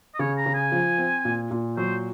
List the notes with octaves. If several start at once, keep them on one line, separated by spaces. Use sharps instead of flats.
D#5
C#3 C#5
A#5
C#3
G#5
F3
C4
A#2
A#2
F#3 C5